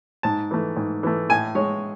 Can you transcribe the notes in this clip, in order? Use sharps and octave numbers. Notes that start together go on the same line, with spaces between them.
G#2 A5
E3 A3
G#2
E3 A3
A2 G#5
G#3 C#5